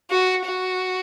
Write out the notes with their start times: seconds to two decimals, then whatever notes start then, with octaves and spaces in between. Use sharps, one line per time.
0.10 F#4
0.46 F#4